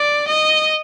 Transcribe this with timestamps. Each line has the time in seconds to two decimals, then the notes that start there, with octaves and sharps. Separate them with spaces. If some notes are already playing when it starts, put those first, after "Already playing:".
Already playing: D5
0.28 D#5